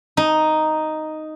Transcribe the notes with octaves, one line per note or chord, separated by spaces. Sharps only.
D#4